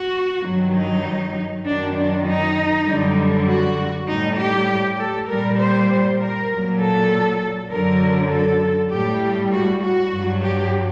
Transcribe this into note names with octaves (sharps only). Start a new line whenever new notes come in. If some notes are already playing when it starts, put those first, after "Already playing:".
Already playing: F#4
G2 D#3 F#3
D#4
F#2 D#3 F#3 D4
D4
D#4
F#2 D3 G3
F#4
A2 G3 D#4
G4
A4
A#2 G3 A#4
C5
A#4
A#2 F#3
A4
F#2 D3 F#3 A#4
A4
A2 G3 G4
F#4
F#4
G2 F#3
G4